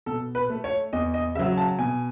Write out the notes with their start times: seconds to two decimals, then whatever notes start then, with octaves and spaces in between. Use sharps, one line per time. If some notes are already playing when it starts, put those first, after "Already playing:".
0.06 B2 A4
0.35 B4
0.50 A3
0.64 C#5
0.93 E2 D#5
1.14 D#5
1.35 C#3 F#3 E5
1.57 A5
1.79 B2 G#5